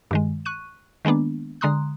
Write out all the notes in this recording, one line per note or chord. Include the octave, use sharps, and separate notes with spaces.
G2 D#3 G#3
C#6 F#6 D#7
D#3 G#3 A#3 B3 D4
D3 G#3 A#5 C6 D#6 F#6